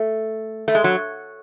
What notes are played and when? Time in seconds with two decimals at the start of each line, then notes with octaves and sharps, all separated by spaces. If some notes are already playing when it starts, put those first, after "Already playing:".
Already playing: A3
0.68 A3
0.75 G#3
0.84 F#3